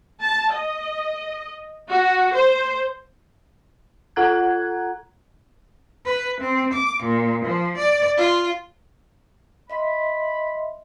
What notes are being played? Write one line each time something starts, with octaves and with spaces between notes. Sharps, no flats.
A5
D#5
F#4
C5
F4 A4 F#5 A#5 F#6 G#6
B4
C4
D6
A#2
F3
D5
F4
D#5 E5 B5 C6